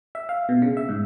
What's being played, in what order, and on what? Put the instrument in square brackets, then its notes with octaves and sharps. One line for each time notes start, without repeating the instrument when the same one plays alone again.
[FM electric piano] E5
F5
B2
C#3
E5
G#2